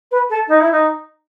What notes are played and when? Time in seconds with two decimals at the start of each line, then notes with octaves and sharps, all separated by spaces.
0.11 B4
0.29 A4
0.48 D#4
0.60 E4
0.71 D#4